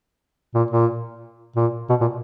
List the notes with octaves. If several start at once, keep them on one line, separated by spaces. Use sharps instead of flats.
A#2
A#2
A#2
B2
A#2